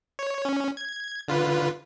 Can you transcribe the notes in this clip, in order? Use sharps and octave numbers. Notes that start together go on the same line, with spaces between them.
C#5
C#4
G#6
D3 F4 B4